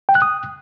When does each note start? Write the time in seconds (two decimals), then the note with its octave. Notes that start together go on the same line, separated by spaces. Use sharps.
0.09 G5
0.15 F#6
0.22 D#6